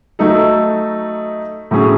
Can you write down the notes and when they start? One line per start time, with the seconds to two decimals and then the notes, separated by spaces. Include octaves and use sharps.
0.19 F#3 A3 D#4 A4
1.71 A2 F#3 A3 C#4 G#4